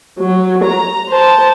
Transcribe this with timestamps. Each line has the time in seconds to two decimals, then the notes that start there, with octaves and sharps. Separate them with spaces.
0.20 F#3
0.64 A#5
1.09 C5 A5